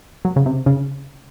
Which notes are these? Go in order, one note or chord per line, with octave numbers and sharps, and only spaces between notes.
F#3
C#3
C3
C#3